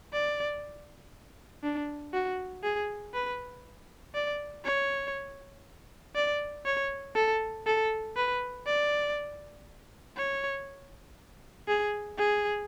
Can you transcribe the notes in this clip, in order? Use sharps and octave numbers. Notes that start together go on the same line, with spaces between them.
D5
D4
F#4
G#4
B4
D5
C#5
D5
C#5
A4
A4
B4
D5
C#5
G#4
G#4